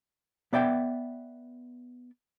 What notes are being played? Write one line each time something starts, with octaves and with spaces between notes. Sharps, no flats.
B3 D5 E5 G5